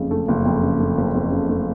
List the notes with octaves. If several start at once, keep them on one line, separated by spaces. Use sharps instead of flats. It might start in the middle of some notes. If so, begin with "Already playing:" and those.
Already playing: F#1 F2 C#3
A3
F#1
F2
C#3
A3
F#1
F2
C#3
A3